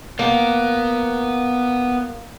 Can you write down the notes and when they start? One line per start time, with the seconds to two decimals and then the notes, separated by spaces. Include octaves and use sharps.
0.19 A#3 B3